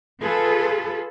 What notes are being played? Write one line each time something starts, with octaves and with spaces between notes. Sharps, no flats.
F4 G#4 A4 B4